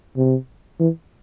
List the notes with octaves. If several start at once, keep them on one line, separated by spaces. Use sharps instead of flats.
C3
E3